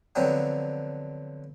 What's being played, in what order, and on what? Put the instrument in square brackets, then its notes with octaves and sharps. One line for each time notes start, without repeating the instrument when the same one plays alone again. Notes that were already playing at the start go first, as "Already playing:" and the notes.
[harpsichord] D3 F3 F#3 B3 C4 D4